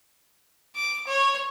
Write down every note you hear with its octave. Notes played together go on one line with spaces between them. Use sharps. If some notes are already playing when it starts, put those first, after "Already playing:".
D6
C#5